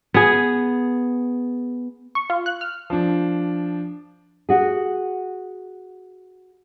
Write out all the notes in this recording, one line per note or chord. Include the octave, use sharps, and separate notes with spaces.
B3 G#4
C#6
F4
F#6
F6
F3 D4
F#4 G#4